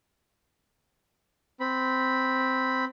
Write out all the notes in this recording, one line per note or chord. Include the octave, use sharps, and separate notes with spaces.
C4 B5